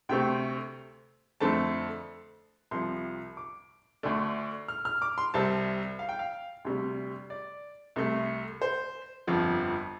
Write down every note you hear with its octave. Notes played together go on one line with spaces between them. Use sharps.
D2 C3 A3 C4 G5
F2 D3 A3 C4 A5
C2 C3 F3 C6
D6
D2 D3 A3 D4
F6
F6
D6
C6
C2 C3 G3 C4 A5
F5
G5
F5
D2 C3 G3
D5
C2 C3 A3
C5
G1 F2 F3